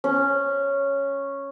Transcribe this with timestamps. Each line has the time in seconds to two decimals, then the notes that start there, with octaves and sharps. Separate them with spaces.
0.04 C#4